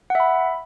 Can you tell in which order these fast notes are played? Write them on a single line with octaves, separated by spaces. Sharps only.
F#5 E5 B5